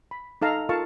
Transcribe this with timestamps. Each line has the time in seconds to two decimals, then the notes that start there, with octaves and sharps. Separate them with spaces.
0.11 B5
0.42 D#4 A4 F5 A#5
0.69 F4 A4 A#4 F5 A5 C#6